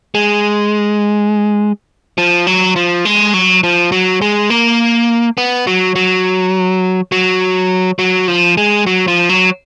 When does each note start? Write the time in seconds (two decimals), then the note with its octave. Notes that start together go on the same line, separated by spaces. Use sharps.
0.15 G#3
2.18 F3
2.47 F#3
2.76 F3
3.05 G#3
3.34 F#3
3.63 F3
3.92 F#3
4.22 G#3
4.50 A#3
5.38 B3
5.67 F#3
5.96 F#3
7.12 F#3
7.99 F#3
8.28 F3
8.57 G#3
8.87 F#3
9.08 F3
9.29 F#3